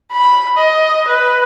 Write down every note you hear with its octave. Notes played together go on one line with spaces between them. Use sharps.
B5
D#5
B4